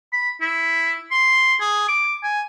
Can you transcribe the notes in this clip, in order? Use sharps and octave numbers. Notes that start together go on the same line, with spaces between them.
B5
E4
C6
G#4
D6
G#5